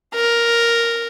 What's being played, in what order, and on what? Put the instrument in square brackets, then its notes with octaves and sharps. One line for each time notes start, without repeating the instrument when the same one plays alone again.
[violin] A#4